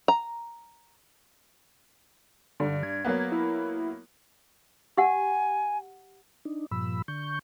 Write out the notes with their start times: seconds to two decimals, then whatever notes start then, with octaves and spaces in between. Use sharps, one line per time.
0.08 A#5
2.60 G2 D3
2.83 G#6
3.05 F#3 A#3 B3
3.32 E4
4.97 G4 F#5 G#5
6.45 D4 D#4
6.71 G2 A#2 F3 B5 E6
7.08 D3 C#6 G6